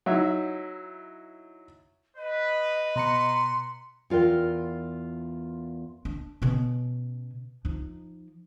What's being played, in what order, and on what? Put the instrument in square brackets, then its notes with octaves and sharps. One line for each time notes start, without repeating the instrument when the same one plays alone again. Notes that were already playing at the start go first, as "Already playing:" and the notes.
[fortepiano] F#3 D#4 E4 E5
[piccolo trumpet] B4 [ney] D#5
[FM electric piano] B2 A#5 C#7 [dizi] C6
[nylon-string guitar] E2 F4 A#4 G5
[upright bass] D4
B2 C#4
F3 D#4